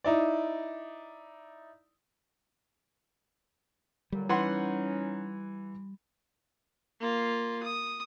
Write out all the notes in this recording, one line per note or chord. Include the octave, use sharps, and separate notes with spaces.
D#4 E4 D5
A#2 D3 F#3 G3
E3 C#4 D#4 F#5 C6
A#3 F4
D#6